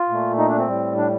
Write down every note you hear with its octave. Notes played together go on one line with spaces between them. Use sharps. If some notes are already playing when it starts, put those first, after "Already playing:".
Already playing: F4
A#2 A3
D#4
D4
C4
A2 G3
D4